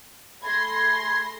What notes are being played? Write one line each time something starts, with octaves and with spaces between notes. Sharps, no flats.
A3 G#4 B5 C6 G#6 A#6